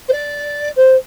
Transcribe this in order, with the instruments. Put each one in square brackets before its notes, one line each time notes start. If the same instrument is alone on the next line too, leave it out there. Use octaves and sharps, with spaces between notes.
[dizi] C5
D5
C5